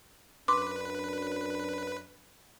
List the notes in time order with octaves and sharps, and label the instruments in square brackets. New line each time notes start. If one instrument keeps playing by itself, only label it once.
[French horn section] F#2 D4 [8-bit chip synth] B4 [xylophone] C6 D6